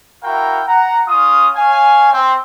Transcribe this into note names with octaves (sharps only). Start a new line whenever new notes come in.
E4 F#4 A#4 F5 G5
F#5 A#5
C#4 F4 D#6
C#5 F5 G#5
C4